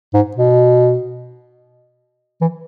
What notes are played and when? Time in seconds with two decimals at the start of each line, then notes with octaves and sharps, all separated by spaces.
0.14 G#2
0.36 B2
2.41 E3